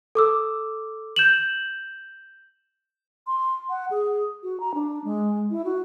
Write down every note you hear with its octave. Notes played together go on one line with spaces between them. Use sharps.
A4 D6 E6
G6 E7 F#7
C6
F#5
G#4
F#4
A#5
D4
G#3
E4
F#4